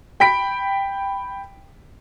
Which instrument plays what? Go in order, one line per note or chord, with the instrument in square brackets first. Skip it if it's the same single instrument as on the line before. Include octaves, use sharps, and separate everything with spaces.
[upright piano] G5 B5 B6 D7